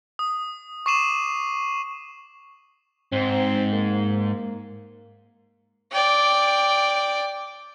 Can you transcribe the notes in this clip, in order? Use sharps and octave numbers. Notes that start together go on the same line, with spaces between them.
D#6
C#6 D6 C7 D#7 E7 F#7
G#2 C4
A#3
D5 G5